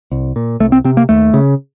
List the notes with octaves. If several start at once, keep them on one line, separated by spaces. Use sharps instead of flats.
C2
A#2
C2 A3
C4
C3 C4
A#3
D#2 A3
C#3